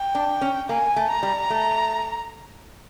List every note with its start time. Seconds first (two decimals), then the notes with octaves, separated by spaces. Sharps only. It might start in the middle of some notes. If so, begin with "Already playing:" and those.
Already playing: G5
0.15 D4
0.41 C#4
0.69 A#3 G#5
0.96 A3
1.10 A#5
1.23 G3
1.50 A3